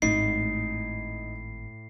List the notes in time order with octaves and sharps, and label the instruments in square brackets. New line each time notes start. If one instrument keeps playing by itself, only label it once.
[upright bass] G#1 C#4 [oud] A2 [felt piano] D#4 [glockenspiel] C7